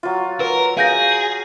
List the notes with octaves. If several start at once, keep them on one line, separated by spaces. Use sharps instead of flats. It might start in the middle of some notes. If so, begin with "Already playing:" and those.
F#3 F4
A#4 B4
G#4 F5 G6 A#6